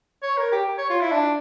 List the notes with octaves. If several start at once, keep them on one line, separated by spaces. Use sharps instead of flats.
C#5
A#4
G4
C#5
F4
E4
D4